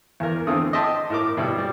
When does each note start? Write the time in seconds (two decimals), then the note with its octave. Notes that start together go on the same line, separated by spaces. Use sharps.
0.20 E2 A#4
0.47 E2 D3 A3 C4 D#6
0.73 D#5 E5 G5 A5 C6
1.10 A2 A#4 D6
1.37 B2 G3 E4
1.58 G3